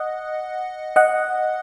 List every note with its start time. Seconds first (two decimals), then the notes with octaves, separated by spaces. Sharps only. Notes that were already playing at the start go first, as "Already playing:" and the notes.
Already playing: D#5 F#5
0.96 D#5 F#5